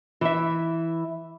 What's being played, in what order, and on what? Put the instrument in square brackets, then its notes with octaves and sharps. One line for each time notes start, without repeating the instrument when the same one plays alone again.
[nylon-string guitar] E3 E5